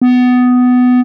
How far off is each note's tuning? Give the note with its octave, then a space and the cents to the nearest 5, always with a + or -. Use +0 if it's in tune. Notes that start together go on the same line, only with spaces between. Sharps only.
B3 +15